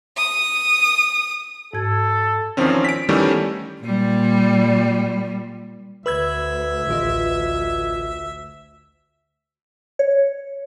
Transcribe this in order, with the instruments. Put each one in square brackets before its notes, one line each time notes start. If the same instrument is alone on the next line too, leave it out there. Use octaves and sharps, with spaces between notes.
[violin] D#6
[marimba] G#2 G#6 [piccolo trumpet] A4
[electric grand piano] E2 D#3 F3 C4 C#4
B6 D7
D#3 E3 G3 A3 B3 C#4
[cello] A#2 G3
[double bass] D2 [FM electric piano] B4 E6 G#6 [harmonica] E5
[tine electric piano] A1 F4 D#5 [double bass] D2
[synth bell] C#5